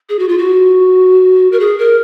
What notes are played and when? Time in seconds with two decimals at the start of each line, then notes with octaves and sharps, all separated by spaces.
0.09 G#4
0.19 F#4
0.28 F4
0.38 F#4
1.52 A#4
1.60 G#4
1.79 A#4